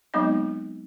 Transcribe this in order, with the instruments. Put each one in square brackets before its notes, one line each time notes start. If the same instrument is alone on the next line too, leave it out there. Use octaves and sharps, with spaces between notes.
[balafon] F#3 G#3 B3 C4 D#4 D#5